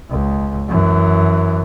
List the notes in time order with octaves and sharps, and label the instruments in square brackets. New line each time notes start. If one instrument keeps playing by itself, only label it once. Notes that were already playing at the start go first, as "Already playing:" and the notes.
[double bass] C#2
F#2 E3